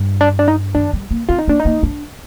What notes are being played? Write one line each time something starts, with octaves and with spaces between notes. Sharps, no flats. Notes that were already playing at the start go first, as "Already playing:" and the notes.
Already playing: G2
D4
D4
D#4
D#3 D4
G3
A#3
C4 F4
D#4
A#3 D4
D#4
A#3
D4